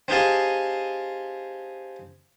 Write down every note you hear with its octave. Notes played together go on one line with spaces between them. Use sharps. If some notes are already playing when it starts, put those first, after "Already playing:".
C4 D#4 G4 G#4 F5 A5